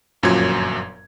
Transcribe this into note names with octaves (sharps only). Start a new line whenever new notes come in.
G1 F#2 A#2 F3 F#3 G#6